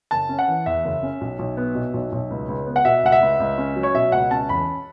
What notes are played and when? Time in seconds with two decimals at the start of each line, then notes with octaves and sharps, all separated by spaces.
0.11 F#1 A5
0.29 C#4
0.39 F#5
0.48 E3
0.66 E2 E5
0.85 F#1
1.03 C#4
1.21 B1
1.39 B1
1.57 B3
1.75 B2
1.94 B1
2.12 B1
2.30 C#2
2.48 C#2
2.67 B3
2.76 F#5
2.85 B2 E5
3.03 C#2 F#5
3.12 E5
3.21 C#2
3.40 C#2
3.58 C#4
3.76 F#3
3.83 C#5
3.95 B2 E5
4.12 C#2 F#5
4.31 C#4 A5
4.49 E2 B5